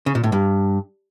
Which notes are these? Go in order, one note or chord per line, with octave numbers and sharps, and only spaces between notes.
C#3
A#2
A2
G2